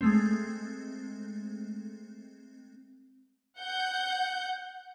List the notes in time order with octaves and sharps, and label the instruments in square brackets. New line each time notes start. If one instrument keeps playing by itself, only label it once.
[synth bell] G#3 A3 C4
[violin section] F#5 G6